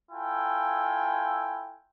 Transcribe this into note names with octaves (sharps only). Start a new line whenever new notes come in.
E4 F4 A4 G5 G#5